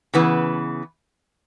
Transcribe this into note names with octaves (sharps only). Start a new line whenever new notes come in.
C#3 E3 B3